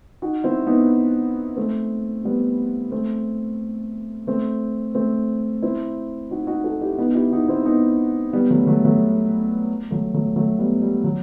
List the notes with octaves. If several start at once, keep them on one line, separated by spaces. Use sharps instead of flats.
D#4 F#4
C4 E4
B3 D#4
A3 C4
G3 B3
A3 C4
A3 C4
A3 C4
C4 E4
D#4 F#4
D#4 F#4
F#4 A4
E4 G4
B3 D#4
E4 G4
D#4 F#4
C4 E4
B3 D#4
G3 B3
F#3 A3
F#3 A3
F#3 A3
F#3 A3
F#3 A3
F#3 A3
G3 B3
G3
F#3